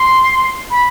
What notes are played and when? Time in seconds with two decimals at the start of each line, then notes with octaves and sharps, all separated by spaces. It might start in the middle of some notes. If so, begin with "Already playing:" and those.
Already playing: C6
0.70 B5